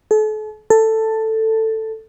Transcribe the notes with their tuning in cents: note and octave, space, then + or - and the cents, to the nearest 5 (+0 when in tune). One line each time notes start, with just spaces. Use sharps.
A4 -40
A4 +10